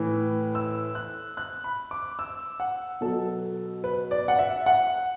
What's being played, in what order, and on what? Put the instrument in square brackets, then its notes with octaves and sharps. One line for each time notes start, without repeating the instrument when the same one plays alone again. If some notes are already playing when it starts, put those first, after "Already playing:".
Already playing: [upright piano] A2 E3
E6
F#6
F#6
B5
D6
E6
F#5
B2 F#3 A4
B4
D5
F#5
E5
F#5